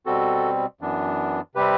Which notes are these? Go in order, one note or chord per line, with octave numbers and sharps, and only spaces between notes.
B2 G3 C4 F#4 A4
F#2 E3 B3 D4
C3 G3 C4 G4 B4